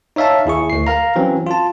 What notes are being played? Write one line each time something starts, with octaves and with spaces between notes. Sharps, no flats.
D#4 C#5 E5 F5 A5
D#2 E4 G#4 C#6
D2 C7
A#4 F5 A#5
E3 F#3 C4 C#4
F4 A5